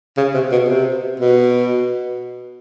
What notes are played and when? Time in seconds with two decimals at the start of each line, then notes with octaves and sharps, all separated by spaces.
0.17 C#3
0.34 C3
0.52 B2
0.69 C3
1.20 B2